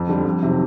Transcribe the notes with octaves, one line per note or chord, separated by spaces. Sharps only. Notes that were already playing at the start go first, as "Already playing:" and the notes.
Already playing: F2
D3 G3
F2
C3 D#3 F#3